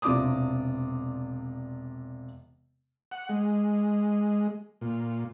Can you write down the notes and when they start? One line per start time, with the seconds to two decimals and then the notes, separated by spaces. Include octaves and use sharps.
0.02 E1 C3 F4 D5 D6 D#6
3.12 F#5
3.29 G#3
4.81 A#2